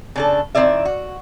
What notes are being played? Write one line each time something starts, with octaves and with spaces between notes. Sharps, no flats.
C#3 D4 A4
D#3 C4 E4 D5 E5
F#4